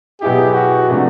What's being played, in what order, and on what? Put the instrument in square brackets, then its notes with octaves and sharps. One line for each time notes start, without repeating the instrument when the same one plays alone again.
[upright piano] B2 F#3 B3 E4 G#4 [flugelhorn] G4
[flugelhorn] F#4
[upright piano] C3 F3 A3 D4